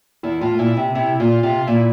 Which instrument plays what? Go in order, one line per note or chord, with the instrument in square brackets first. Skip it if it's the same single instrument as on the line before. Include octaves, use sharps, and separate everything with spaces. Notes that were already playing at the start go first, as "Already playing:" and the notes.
[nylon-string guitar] E2 [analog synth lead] E4
[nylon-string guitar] A2 [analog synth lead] F4
[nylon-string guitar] A#2 [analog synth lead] E4
[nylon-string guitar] C3
[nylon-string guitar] C3 [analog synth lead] E4
[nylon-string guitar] A#2 [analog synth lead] F4
[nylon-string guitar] C3 [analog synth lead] F4
[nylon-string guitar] A#2 [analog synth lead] E4